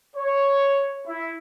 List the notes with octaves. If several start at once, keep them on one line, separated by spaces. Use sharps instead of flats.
C#5
E4